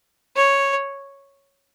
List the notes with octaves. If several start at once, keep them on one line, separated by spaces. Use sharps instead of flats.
C#5